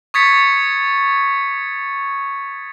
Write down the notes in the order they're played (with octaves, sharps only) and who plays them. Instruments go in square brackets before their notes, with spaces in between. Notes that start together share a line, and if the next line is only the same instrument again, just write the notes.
[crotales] C#6 D#6 G#6 A6 B6 C#7